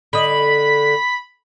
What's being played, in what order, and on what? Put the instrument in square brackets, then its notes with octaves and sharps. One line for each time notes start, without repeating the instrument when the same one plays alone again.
[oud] D3 D#5 [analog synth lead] B5